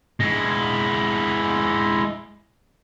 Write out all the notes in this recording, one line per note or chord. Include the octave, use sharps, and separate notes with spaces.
G#3 E4